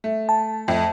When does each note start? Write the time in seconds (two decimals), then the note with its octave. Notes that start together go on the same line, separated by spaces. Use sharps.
0.04 A3
0.29 A5
0.68 F2 A3